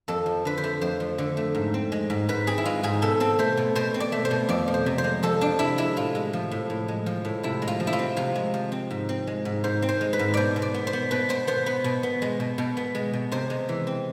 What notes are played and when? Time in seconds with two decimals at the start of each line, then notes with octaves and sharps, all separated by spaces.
0.08 F2 A4
0.26 F3
0.45 D3 B4
0.57 C5
0.64 A3
0.81 F2 C5
1.00 F3
1.18 D3
1.37 A3
1.55 G#2
1.74 C4
1.92 G#3
2.10 G#2
2.29 G#2 B4
2.47 C4 G#4
2.58 E4
2.65 G#3 F4
2.83 G#2 G#4
3.02 B2 A4
3.20 C4 A4
3.39 A3 C5
3.57 B2
3.75 B2 C5
3.94 C4
4.00 D5
4.12 A3
4.25 C5
4.31 B2
4.49 F2 D5
4.68 F3
4.74 C5
4.86 C3
4.98 C5
5.04 G#3
5.23 F2 A4
5.41 F3 D4
5.59 C3 E4
5.78 G#3 E4
5.96 A2 F4
6.15 G#3
6.33 F3
6.51 A2
6.70 A2
6.88 G#3
7.06 F3
7.25 A2
7.43 C3 E4
7.62 G#3
7.68 F4
7.80 F3
7.87 E4
7.93 F4
7.99 C4
8.17 C3 F4
8.35 G#3
8.54 F3
8.72 C4
8.91 G#2
9.09 C4
9.27 G#3
9.45 G#2
9.64 G#2 C5
9.82 C4
9.89 C5
10.01 G#3
10.13 B4
10.19 G#2
10.34 B2 C5 D5
10.56 B2
10.62 D5
10.74 B3
10.87 C5
10.93 B3
11.11 B2 B4
11.29 B2 C5
11.47 B3 C5
11.66 B3 B4
11.84 B2
12.03 B3
12.22 G#3
12.40 B2
12.58 B2
12.77 B3
12.95 G#3
13.13 B2
13.32 C3 C5
13.50 G#3
13.69 E3
13.87 C4